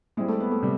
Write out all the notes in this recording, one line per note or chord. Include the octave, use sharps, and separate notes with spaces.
G3 G#3 C4 E4
A3
B3
A3
C3 G3